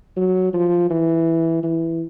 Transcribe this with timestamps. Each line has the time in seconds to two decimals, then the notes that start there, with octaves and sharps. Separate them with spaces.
0.17 F#3
0.53 F3
0.90 E3
1.63 E3